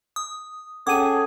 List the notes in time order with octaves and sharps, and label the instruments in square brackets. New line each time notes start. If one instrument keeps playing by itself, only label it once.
[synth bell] D#6
[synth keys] C#4 F#5 G5 [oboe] G#4 [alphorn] A4 [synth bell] D6 D#7